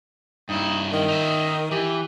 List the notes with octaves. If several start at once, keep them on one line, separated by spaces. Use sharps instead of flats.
G2 D#4 E4
D#3
D#4 E5
E3 G4